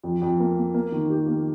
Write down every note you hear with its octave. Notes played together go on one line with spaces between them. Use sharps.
F2
F2
A#3
A#3
A#3
D#3
G4
A#3